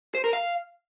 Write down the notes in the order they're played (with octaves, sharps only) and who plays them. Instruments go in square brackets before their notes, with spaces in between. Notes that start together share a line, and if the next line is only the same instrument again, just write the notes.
[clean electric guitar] C5
A#4
F5